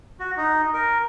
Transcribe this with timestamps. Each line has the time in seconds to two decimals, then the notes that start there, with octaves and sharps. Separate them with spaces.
0.20 F#4
0.37 D#4
0.74 A#4